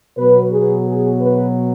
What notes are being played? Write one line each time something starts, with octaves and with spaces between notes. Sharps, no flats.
B2 F#3 B4
G#4
G#4
B4